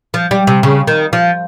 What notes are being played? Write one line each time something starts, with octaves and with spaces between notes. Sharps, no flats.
F3
G3
C3
C#3
D#3
F3